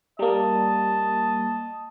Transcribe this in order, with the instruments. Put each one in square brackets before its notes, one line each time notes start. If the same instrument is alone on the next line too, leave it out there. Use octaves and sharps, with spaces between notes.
[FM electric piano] G3 A#3 [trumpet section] D#5 A5